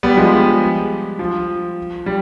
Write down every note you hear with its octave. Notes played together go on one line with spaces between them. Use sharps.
G3 B3
F3 G#3
G3
F3
G3